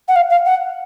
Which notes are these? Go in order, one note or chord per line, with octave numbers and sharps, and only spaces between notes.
F#5
F5
F5
F#5